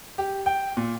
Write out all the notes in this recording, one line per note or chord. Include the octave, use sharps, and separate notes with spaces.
G4
G5
A#2